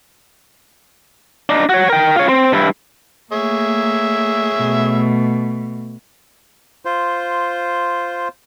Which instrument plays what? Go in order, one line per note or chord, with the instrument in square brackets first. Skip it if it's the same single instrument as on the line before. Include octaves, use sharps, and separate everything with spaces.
[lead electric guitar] D4 D#4
F#4 C#5
A#4 G5
F4 C#5
C4
G2 E4
[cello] A3 A#3 [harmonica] G#4 C#5 E5
[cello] B2 A3
[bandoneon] F4 C5